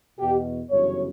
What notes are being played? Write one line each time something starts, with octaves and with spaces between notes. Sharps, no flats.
E2 B2 G4
G1 F#2 C#3 E3 C#5